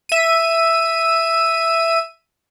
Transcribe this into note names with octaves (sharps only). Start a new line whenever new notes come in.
E5 D#7